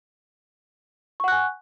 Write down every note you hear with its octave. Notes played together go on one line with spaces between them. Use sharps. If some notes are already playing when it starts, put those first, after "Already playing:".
F#5 G#5 C#6 F#6